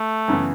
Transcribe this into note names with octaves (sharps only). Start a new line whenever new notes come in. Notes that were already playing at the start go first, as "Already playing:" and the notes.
Already playing: A3
F#2 C#3 E3 B3